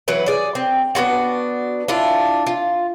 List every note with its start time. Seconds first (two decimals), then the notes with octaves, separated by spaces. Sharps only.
0.08 E3 F#3 B4 F#5
0.26 G#4 D5
0.55 C4
0.95 B3 D4 F4 F#4
1.88 D4 E4 F4
2.47 F4